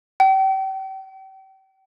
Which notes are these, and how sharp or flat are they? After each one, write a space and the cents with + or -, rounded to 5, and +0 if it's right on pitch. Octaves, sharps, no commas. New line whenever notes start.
G5 -35